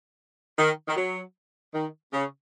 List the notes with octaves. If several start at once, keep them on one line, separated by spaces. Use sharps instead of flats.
D#3
D#3
F#3
D#3
C#3